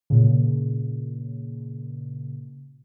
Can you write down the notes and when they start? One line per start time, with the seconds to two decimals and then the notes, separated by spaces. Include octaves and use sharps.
0.10 A#2 C#3